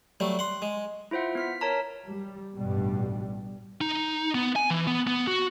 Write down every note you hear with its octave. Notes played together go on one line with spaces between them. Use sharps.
F#3 G3 A3
F#5 C6
G#3
E4 F4 C5 E5 F#5
B3 F6 B6
A#4 C#5 A5 A#5 B6
G3
A1 G2 B2 G3
D#4
B3
G#5
E3
B3
B3
F#4